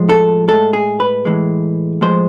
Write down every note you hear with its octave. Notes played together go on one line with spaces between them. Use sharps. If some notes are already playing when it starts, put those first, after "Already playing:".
Already playing: A2 F3 G#3
A4
A2 G#3 A4
G#4
B4
A2 E3 G#3
A2 F3 G#3 C5